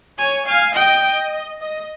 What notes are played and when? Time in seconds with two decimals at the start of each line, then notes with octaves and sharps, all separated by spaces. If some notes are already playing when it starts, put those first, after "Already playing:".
0.19 C#5 G#5
0.46 F5 G#5
0.74 D#5 G5
1.03 D#5
1.60 D#5